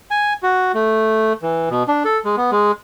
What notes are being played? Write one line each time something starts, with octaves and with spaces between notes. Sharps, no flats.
G#5
F#4
A3
E3
B2
D4
A4
G#3
B3
G#3